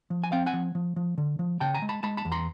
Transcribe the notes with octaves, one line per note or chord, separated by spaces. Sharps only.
F3
G#5
C4 F5 G5
F#5 G#5
F3
F3
F3
D3
F3
C#3 G5 A5
G#5 A#5
G#3
A5 B5
G#3 A5 B5
A5 B5
E2
A#5 C6